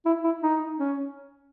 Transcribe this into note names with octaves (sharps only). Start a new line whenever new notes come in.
E4
E4
D#4
C#4